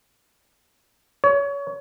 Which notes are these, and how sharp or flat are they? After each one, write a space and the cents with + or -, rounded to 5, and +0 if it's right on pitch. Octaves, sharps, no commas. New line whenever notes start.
C#5 +30